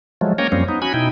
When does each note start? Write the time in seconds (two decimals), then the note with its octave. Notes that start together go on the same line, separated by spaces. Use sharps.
0.21 F3 F#3 G#3 A3
0.38 A#3 C#4 C#5 G5 G#5 A#5
0.52 F#2 F3 G3 A#3 C4 C#4
0.69 B3 D#4
0.82 C#4 F#4 G#5 B5
0.94 B2 D#4 E4 G5